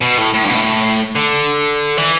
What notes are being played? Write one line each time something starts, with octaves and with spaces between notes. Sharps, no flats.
B2
A2
A2
G2
B2
A2
D3
E3